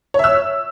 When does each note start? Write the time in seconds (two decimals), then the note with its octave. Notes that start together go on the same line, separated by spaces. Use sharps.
0.14 C#5
0.19 E5
0.24 E6